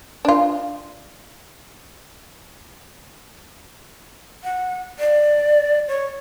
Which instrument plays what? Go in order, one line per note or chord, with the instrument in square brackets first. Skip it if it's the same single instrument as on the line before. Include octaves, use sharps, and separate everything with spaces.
[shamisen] D4 F4
[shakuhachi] F#5
D5
C#5